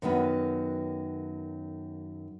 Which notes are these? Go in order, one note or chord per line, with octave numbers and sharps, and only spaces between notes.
F#2 D#3 F#3 B3